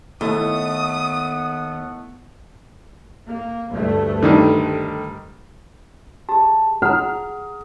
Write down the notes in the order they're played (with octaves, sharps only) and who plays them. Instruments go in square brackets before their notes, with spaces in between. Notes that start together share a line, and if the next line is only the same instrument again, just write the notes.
[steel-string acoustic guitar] D#2 [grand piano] A3 [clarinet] B3 [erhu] D#6
[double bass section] A#3
D2 G2 A3
[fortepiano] D3 D#3 G3
[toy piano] G4 G#4 [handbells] A5
[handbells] G#4 [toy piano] F#5 A#5 [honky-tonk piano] F6